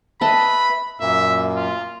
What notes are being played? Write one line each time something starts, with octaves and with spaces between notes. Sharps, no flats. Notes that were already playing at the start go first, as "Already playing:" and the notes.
B4 D#5 E5 A5 B5
F#2 A#2 A#3 E5
F4